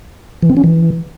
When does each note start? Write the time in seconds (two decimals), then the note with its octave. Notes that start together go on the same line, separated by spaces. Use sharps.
0.42 E3
0.50 C4
0.57 C#4
0.64 E3